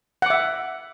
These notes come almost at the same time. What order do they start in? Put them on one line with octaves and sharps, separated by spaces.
F#5 D6 E5